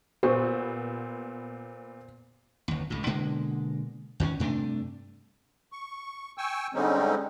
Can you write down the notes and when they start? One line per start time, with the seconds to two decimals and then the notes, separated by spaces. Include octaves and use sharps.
0.23 A#2 B3 G4 C5
2.68 G1 D#2
2.90 C#2 A2
3.06 B2 D3 G#3 A#3
4.20 E2 D#3 B3 C#4
4.40 G2 C3 A3 D4
5.72 C#6
6.38 G5 G#5 C#6 E6
6.74 D3 G3 G#3 C4 C#4 D#4